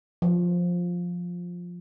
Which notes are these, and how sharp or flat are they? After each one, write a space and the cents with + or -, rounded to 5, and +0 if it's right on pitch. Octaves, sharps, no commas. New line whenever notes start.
F3 +10